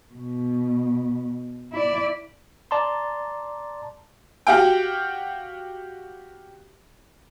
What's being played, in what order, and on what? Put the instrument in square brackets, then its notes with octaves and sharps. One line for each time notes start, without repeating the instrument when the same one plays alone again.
[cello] B2
E4 D5
[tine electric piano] D5 A5 A#5 C6
[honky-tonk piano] F#4 G4 F5 G5